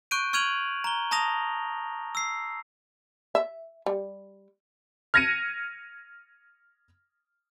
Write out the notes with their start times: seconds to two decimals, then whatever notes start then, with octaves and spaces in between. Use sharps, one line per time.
0.11 C#6 F#6 G6 D7 D#7
0.33 C#6 F6 G#6 D#7 F7 F#7
0.84 A#5 G7
1.11 A5 A#5 D#6 A#6 F7
2.15 E6 C7
3.35 E5
3.86 G3
5.14 F6 G#6 A#6 C#7 D#7